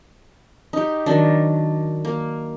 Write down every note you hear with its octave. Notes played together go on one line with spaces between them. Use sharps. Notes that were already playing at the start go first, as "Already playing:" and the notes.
D#4 G4
D#3 F#3 D4
A#3